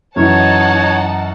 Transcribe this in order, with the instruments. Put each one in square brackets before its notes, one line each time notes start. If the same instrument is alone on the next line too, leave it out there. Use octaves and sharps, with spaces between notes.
[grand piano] F#2 E3 [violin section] D#4 F#5 A5 [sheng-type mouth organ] C#5